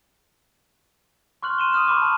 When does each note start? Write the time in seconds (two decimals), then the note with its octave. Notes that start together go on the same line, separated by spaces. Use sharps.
1.42 C6 C#6 F6 F#6 F#7
1.58 C6 D#7 E7 G7
1.73 D#6 F6 D#7
1.88 B5 C#6 D6
2.02 A5